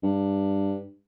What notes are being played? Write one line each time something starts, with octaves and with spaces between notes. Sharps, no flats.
G2